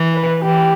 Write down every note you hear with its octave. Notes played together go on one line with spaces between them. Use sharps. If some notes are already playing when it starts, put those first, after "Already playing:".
Already playing: E3
B4
E3 G4